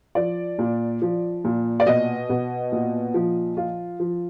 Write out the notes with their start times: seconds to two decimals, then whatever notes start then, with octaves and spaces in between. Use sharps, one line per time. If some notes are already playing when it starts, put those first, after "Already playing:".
0.15 F3 D5
0.59 A#2
1.02 F3
1.44 A#2
1.80 D5
1.86 B2 D#5
2.30 B2
2.72 A#2
3.14 F3
3.57 F3 F4
4.00 F3